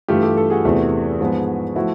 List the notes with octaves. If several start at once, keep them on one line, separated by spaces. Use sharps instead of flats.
G2 E3 A3 F4 G4
G4 A4
G4 A4
F#4 G#4
E2 C3 E3 A3
G#2 F3 G#3 B3
F3 A3 E4 F#4